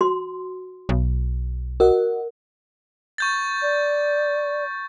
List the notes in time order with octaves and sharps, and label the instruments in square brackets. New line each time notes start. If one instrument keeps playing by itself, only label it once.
[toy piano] F#4 C6
[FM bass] B1
[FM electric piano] F#4 D#5 F#5 [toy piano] A#4
[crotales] C#6 G6 A6
[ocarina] D5